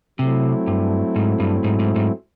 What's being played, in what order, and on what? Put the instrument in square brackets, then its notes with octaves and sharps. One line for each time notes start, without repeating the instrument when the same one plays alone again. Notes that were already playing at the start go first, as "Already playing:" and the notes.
[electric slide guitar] C3 [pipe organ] F#3 A3 C4 E4
[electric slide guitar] G2
G#2
G2
G#2
G#2
G#2